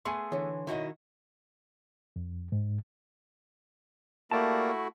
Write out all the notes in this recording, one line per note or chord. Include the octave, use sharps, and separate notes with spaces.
A3 B3 G#4 G#5 C6
D3 E3 C#5
B2 D#3 E4 F#4 D#5
F2
G#2
A3 A#3 E4 F#4 G4 D5 A5